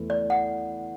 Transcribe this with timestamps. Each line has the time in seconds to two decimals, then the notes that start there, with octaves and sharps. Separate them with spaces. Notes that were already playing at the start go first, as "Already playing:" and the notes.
Already playing: E2 E3 A3 E4
0.10 D5
0.30 F#5